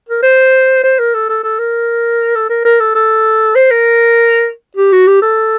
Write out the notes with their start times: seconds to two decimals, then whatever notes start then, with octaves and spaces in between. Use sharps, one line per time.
0.08 A#4
0.22 C5
0.83 C5
0.99 A#4
1.14 A4
1.29 A4
1.43 A4
1.59 A#4
2.35 A4
2.49 A#4
2.65 A#4
2.80 A4
2.95 A4
3.55 C5
3.70 A#4
4.77 G4
4.92 F#4
5.07 G4
5.22 A4